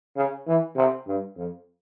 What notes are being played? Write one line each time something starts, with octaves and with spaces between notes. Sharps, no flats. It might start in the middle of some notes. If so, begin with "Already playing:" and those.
C#3
E3
C3
G2
F2